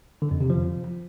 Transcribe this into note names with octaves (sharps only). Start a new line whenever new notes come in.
D3
F2
C3
F3